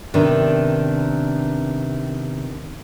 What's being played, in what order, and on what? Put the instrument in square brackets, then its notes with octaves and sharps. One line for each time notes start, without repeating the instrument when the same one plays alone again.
[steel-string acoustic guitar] C3 D#3 B3 D4